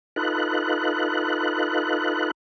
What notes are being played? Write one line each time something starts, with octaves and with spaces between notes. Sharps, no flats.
D#4 F4 A4 B4 F#6